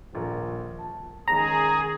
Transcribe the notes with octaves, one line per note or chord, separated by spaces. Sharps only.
D#1 A#1 A#4
A5
D#3 G#3 C#4 G#4 A#5